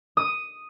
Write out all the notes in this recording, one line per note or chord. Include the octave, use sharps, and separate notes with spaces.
D#6